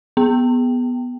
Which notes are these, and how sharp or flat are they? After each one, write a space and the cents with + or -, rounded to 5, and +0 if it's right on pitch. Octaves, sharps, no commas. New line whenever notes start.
B3 +0 G5 +0